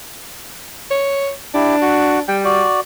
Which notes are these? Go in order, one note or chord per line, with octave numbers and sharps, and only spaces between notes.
C#5
D4 E4 G4
F#4
G3 G5
F#4 D5